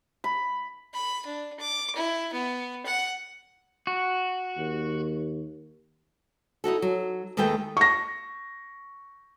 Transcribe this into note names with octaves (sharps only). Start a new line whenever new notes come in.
B5
B5
D4
D6
E4
B3
F#5
F#4
D#2
D#4 E4 F#4 A4
F#3
D#2 D#3 G#3 A3 B4 G5
C#6 A#6